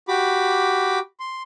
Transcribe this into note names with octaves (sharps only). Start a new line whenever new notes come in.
F#4 G4 B5 D6
C6